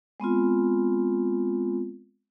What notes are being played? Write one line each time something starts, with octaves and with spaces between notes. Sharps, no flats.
G#3 B3 C4 F4